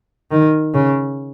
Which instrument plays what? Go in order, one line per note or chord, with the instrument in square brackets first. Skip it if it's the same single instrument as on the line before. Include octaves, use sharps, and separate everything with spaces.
[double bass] D#3
C#3